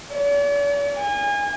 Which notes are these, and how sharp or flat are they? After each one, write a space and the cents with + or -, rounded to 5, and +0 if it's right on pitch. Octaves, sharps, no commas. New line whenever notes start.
D5 -45
G#5 -30